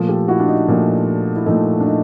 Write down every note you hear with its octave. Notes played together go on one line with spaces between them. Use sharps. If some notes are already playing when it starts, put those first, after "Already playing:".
Already playing: A#2 F3 A3
G4 A4
E4 F#4
D4
D#4
A#2 F3 A3 D#4
E4
A#2 F3 A3 D#4
D4
D#4